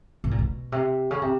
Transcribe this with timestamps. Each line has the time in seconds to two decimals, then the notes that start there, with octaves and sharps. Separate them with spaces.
0.24 B2
0.31 A#2
0.39 B2
0.72 C3
1.11 C#3
1.22 C3